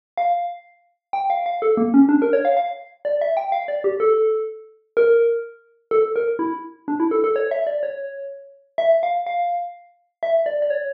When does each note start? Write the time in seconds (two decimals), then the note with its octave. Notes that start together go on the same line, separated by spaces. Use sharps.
0.17 F5
1.13 G5
1.30 F5
1.46 F5
1.62 A4
1.77 A#3
1.94 C#4
2.09 D4
2.22 A#4
2.33 C#5
2.45 F5
2.57 F5
3.05 D5
3.21 E5
3.37 G5
3.52 F5
3.68 D5
3.84 G4
4.00 A4
4.97 A#4
5.91 A4
6.16 A#4
6.39 E4
6.88 D4
7.00 E4
7.11 A4
7.24 A4
7.36 C#5
7.51 E5
7.67 D5
7.83 C#5
8.78 E5
9.03 F5
9.27 F5
10.23 E5
10.46 D5
10.62 D5
10.70 C#5